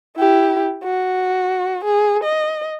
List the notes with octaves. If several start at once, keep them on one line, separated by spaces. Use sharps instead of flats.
E4 G4
F#4
G#4
D#5